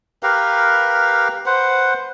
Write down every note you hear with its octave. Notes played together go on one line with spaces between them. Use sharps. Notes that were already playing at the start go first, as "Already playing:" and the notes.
G4 A#4 B4 F5
B4 C5 F#5